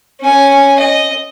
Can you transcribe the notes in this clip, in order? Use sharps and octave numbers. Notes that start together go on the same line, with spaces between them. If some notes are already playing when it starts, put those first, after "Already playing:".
C#4 G#5
D#5